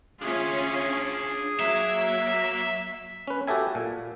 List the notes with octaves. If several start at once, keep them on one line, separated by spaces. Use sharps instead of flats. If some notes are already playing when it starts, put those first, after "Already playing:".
C#4 D4 F4 G#4 E5
F#3 A#3 E5
C#4 B4
F#4 G4 A4 E5 G#5
A#2